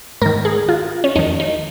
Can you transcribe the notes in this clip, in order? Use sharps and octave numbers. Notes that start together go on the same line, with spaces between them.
G#2 D#3 A#4
G#4
F4
C#4
F2 D#3 D#4
D#4